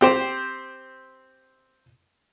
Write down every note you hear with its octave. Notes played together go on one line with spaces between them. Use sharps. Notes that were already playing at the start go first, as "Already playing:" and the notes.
C4 G4 C5